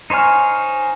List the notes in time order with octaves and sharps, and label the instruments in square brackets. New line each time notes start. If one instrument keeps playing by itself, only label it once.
[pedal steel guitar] D#4 C5 C#5 G#5 F6